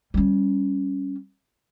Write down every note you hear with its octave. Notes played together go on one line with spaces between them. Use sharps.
G3 C#4